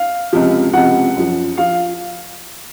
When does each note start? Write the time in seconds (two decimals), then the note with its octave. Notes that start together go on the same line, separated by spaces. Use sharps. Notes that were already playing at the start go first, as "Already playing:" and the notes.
Already playing: F5
0.33 C#2 C3 F3
0.73 C#2 C3 F3 F#5
1.16 F#2 F3
1.57 F3 F5